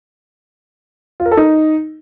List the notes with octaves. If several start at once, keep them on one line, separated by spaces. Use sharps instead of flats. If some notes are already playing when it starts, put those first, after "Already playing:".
F4
A#4
A4
D#4